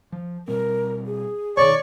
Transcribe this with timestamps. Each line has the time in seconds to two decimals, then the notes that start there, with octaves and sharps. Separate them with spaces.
0.12 F3
0.48 B2 G3 C4 A#4
1.06 G#4
1.57 C2 B2 D#3 C#5 D5 C#6